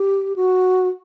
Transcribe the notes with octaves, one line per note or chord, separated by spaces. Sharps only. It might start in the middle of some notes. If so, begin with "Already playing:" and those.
Already playing: G4
F#4